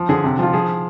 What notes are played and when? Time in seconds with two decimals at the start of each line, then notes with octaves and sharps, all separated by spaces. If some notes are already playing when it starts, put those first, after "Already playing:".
Already playing: F3
0.09 D3 G#4
0.24 C3
0.39 F3 F4
0.53 F3 G#4